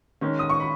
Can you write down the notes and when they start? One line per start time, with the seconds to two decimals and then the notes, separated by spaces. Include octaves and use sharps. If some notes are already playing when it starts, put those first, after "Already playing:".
0.21 D#3 G#3 C#4
0.39 D#6
0.49 C#6
0.60 B5